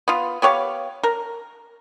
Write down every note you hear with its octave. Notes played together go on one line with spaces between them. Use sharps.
B3 F4
B3 G4 C#5 F5
A#4